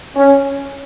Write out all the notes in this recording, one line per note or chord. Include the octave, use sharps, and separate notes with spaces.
C#4